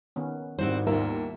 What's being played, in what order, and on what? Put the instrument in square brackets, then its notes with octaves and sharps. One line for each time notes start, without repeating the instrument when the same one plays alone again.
[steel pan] D#3 B3 C#4
[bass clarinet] G#2 [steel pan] D#3 G3 E4 [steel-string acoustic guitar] C4 F#4 C5
[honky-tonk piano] D#2 A#4 [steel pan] G3 B3 F4 [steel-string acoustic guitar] A#3 E5